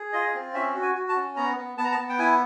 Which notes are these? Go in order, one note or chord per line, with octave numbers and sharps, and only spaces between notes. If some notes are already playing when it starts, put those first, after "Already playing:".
Already playing: G#4
F4 D#5
C4
C#4 E5
F#4
G#5
F#4
A5
C#4
B3 A#5
B3
B3 A5
A#5
A5
B3
G5
E4 G#5